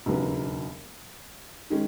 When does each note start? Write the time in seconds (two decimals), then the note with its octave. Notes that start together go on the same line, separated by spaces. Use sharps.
0.06 E1 D#2 C#3 F#3 B3
1.70 D#3 G#3 C#4